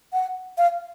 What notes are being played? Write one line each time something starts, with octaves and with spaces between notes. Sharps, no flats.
F#5
F5